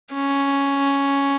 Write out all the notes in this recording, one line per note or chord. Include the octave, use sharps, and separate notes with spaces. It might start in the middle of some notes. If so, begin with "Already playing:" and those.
C#4